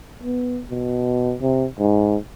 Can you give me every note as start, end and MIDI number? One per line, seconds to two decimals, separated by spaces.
0.23 0.61 59
0.71 1.34 47
1.42 1.65 48
1.79 2.17 44